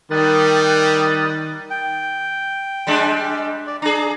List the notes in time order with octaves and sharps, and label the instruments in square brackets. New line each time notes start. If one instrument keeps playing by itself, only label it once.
[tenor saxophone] D#3 [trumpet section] G3 [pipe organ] D#6 F#6 A6
[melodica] G5
[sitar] G3 G#3 D4
[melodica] D5
[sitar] D4 G#4 [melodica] A#5